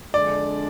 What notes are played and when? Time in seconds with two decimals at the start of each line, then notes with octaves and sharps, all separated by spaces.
0.14 F2 D3 G#3 D4 D5